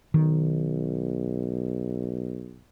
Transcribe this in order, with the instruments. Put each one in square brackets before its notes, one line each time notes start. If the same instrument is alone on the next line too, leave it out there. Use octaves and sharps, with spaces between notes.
[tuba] B1 [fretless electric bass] D#3